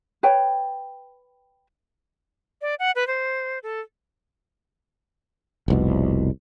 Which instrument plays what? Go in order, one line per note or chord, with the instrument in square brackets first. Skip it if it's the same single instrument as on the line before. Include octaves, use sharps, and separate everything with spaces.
[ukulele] B4 C#5 G5
[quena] D5
F#5
B4
C5
A4
[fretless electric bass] F1 C2 B2